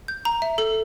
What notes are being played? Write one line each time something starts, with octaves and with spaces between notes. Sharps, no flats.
G6
A#5
E5
A4